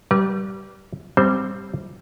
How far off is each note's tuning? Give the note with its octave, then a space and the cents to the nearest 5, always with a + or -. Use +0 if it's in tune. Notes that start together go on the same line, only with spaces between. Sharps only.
G3 -20 B4 -45
G3 +0 C4 +0 C5 +0